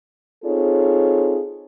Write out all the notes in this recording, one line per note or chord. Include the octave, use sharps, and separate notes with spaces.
C4 D#4 F4 G#4 A4 C#5